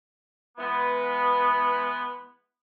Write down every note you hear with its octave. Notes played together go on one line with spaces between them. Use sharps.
E3 G#3 B3